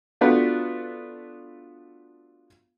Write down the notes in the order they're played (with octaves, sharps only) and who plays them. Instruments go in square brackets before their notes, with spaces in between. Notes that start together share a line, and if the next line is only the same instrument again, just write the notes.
[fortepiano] A3 B3 D4 F4 F#4 B4